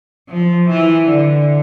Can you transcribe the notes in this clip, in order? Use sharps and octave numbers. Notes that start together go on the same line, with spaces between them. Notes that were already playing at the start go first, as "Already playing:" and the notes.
F3
E3
D3